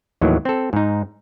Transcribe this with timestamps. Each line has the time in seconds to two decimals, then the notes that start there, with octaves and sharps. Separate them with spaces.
0.21 D#2 A2 D#3 E3 F#3
0.45 C4 A4
0.73 G#2 D#4